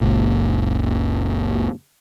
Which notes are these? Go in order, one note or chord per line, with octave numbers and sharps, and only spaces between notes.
F#1 C#2 A#2